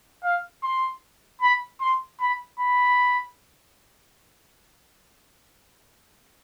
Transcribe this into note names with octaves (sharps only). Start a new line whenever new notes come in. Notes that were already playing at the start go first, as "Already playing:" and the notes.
F5
C6
B5
C6
B5
B5